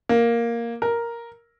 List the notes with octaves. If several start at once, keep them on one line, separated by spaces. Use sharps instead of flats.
A#3
A#4